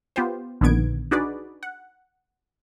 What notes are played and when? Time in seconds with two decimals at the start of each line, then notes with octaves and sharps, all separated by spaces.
0.16 B3 F4 G4 C5
0.61 A#1 D3 D#3 B3 G#6 D7
1.11 D4 D#4 F#4 G#4 B4 D5
1.63 F#5